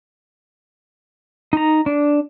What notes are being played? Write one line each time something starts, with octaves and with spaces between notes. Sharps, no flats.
D#4 A#5
D4